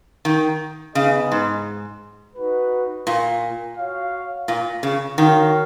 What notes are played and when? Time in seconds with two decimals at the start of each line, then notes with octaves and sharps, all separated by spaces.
0.25 D#3
0.95 C#3 B3 D#4 G#4 D#5
1.32 G#2
2.36 D#4 F#4 B4
3.07 A#2
3.77 F#4 C#5 F5
4.48 A#2
4.83 C#3
5.18 D#3 F#4 A#4 C#5 F5